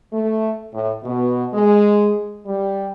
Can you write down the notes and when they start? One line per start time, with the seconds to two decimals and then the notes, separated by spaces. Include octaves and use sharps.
0.12 A3
0.72 A2
1.04 B2
1.54 G#3
2.46 G3